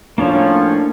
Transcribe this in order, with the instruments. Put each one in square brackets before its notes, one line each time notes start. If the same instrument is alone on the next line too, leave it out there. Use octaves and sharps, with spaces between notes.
[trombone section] A2 F3 C#4 [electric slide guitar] A#3 D4 C#5